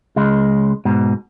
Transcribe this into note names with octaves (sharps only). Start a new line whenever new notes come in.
C#2 G#3
G#2 B2